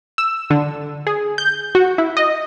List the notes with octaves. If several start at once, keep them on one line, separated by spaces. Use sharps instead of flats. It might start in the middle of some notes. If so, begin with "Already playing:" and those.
E6
D3
G#4
G6
F#4
E4
D#5